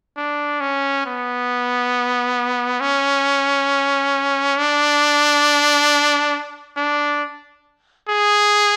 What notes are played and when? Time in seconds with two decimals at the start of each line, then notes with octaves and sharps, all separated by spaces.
0.17 D4
0.60 C#4
1.05 B3
2.80 C#4
4.57 D4
6.77 D4
8.09 G#4